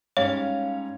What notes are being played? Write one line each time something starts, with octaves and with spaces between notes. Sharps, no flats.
G#2 G3 C#4 C#5 F5